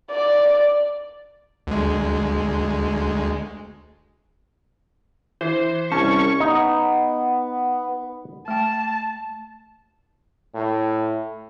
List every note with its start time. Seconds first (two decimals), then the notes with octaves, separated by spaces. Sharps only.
0.11 D5
1.67 D2 G#3
5.41 E3 C5
5.92 C2 C#4 A5 C#6
6.40 B3 D#4
8.48 A3 G5 A5
10.55 A2